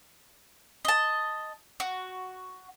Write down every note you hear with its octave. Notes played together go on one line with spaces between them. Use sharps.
D#5 A5
F#4